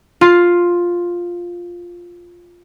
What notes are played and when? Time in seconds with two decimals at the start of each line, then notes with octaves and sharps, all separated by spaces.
0.21 F4 C7